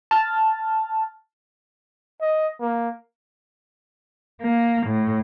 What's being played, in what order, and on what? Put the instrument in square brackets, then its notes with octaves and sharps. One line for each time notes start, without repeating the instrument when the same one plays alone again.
[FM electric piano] A5 F6 A6
[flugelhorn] D#5
A#3
[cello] A#3
A2